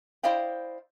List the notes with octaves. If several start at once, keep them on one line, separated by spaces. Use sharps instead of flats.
E4 C5 D5 D#5 F5 G5